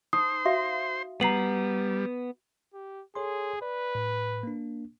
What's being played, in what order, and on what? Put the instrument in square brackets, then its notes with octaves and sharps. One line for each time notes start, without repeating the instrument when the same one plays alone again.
[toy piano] D#4 [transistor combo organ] C5 C6 [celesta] D#6
[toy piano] F#4 E5 F5
[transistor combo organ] G3 [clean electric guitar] B3 [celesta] A#5 C7 F#7
[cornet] G4
[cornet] G#4 [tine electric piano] A4 C#5 C6
[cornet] B4 [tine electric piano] D5
[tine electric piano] A2
A#3 D4